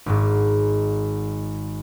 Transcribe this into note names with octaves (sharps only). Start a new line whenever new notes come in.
G#1 G#2